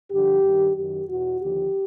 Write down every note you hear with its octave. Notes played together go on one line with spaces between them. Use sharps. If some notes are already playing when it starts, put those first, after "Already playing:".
G2 D3 F3 G4
G2 D#3
F#2 D#3 G4
E2 B2 F#4
D#2 D3 F3 G4